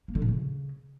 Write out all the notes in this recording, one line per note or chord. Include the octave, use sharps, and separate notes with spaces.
A#3
D3
A#2
C#3